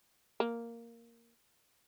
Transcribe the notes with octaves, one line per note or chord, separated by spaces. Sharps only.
A#3